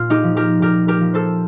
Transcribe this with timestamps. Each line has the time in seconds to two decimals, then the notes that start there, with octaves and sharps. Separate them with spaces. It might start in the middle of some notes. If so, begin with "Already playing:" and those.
Already playing: A#2 F4
0.10 D#4 G4
0.24 F3
0.37 G4 A#4
0.62 A#2 G4 A#4
0.88 G4 A#4
1.01 F3
1.14 A4 C5